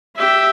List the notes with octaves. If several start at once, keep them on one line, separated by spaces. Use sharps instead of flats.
G4 E5